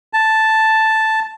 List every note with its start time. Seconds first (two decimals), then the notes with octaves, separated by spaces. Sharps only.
0.13 A5